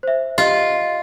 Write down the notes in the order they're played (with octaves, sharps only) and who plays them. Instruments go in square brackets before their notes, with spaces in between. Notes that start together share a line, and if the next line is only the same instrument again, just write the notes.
[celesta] C5 E5
[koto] F4 [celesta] G4 D#5